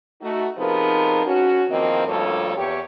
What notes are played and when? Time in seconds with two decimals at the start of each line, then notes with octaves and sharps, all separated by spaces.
0.22 A3 D#4 F#4
0.58 C3 F3 B3 D#4 G#4 A#4
1.26 C#4 F#4
1.70 E2 D#3 F3 A#3 C4 D#5
2.07 D2 G2 F3 A#3 A4 C#5
2.57 E2 G4 C#5